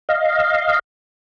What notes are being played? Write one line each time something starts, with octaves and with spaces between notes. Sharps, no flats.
D#5 F5